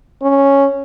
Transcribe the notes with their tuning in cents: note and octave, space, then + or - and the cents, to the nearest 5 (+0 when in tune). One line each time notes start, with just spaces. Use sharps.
C#4 -5